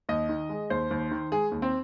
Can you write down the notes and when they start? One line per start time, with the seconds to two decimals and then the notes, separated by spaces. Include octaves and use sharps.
0.09 D#2 D#5
0.29 D#3
0.49 G#3
0.70 D#2 C5
0.91 D#2
1.11 D#3
1.32 G#3 G#4
1.52 D#2
1.62 C4